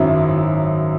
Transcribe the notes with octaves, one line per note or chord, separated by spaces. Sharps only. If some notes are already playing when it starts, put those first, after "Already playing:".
Already playing: G#1 F#2 F#3 E4